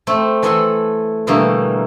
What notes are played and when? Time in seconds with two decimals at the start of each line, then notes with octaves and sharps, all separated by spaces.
0.07 A3 C4
0.43 E3 A4 B4 E5 F#5 C6
1.27 B2 D3 E3 G3 A3 A#3